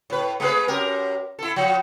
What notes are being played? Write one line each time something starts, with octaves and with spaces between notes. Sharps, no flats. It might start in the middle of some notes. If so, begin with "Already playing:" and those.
A2 B4
G#3 G#4 B4
F#2 G4 A#4
E4 A4
F3